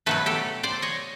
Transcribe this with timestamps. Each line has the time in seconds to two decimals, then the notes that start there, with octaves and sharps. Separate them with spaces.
0.06 B2 F#3 A3 A4 B4
0.26 G4 A4
0.63 C5 D5
0.82 C#5 D#5